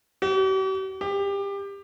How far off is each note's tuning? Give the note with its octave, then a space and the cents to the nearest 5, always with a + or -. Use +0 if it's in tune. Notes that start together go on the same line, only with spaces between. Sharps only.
G4 -45
G4 +25